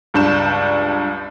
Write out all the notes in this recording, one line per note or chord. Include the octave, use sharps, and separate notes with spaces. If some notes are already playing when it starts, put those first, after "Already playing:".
C#2 G2 D4 G6 E7